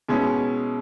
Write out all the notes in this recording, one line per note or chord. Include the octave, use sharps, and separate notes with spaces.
B2 G#3 C#4 E4